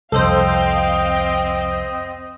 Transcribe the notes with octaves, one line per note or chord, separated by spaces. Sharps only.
C2 F2 C4 A4 C5 D#5 F5 G5